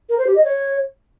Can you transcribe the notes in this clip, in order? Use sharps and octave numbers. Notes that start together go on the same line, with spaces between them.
A#4
C5
G4
D#5
C#5